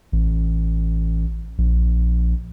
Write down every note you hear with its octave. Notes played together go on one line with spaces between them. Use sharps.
A1
A#1